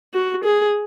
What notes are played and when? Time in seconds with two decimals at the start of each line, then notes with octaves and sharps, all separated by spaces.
0.14 F#4
0.44 G#4